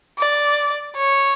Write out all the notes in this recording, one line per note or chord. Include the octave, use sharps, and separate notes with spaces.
D5
C#5